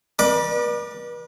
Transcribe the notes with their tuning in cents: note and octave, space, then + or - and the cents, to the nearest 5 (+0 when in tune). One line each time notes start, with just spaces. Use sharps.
B4 -40 D5 +30 D6 +0